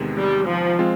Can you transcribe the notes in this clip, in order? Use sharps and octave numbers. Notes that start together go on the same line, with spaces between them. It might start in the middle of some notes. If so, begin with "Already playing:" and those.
Already playing: E2 C3 D#3 G#3 B3
G3
F3
G#3 C4 F4